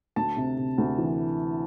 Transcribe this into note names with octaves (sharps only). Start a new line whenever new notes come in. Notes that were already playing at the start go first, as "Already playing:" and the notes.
D2 A5
C3
C3
D2
E3